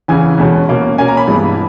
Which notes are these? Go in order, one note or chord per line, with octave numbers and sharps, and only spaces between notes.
E2 C#3 E3 G#5
E2 B2 G#3 C#4
B2 A#3 C#4
B2 A#3 C#4 G#5
A#5
B5
G2 E3 G#3 B3